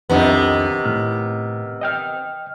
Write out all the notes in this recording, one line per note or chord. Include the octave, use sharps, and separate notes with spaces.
C2 F2 C3 D#3 B3 D4
A2 F6
D#5 G5 F6